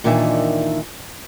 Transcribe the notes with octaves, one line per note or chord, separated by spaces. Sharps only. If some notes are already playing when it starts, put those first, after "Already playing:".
A#2 D#3 E3 D4 D#4 E5